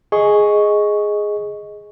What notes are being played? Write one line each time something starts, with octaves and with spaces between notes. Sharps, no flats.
G#4 D#5 C#6